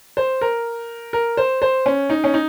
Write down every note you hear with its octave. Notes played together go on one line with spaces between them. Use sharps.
C5
A#4
A#4
C5
C5
C#4
D#4
C#4
D#4